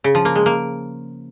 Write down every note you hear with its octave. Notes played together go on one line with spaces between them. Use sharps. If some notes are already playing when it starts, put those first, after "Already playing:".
C#3
F3
A#3
G#3
A#3